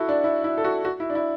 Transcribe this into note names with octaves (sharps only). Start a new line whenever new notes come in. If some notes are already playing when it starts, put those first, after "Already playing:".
Already playing: E4 F#4 A4
D4
E4
E4
A4
F#4
F#4
E4
D4
E4